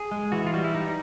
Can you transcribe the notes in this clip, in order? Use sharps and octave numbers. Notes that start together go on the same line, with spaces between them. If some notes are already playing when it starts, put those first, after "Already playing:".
Already playing: G#4
G#3
E3 F#4
F4
G3 F#4
E4
G3 D#4